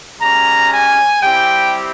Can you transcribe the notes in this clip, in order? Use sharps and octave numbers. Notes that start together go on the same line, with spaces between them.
G#3 C#4 G4 A#5
G#5
G3 C4 E4 G4 G5